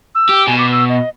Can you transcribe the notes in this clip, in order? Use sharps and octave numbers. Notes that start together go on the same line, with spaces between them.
E6
G4
B2 G#5
D6
E6
D#5